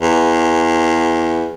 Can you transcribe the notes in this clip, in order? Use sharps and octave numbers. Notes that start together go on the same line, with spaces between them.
E2